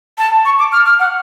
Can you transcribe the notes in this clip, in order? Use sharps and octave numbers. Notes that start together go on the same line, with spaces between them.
A5
C#6
D6
F6
F6
F#5